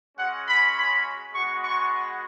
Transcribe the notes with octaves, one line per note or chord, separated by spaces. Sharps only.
G#3 C#4 F#4 F#5
B5
B5
G#3 B3 F#4 C#6
C#6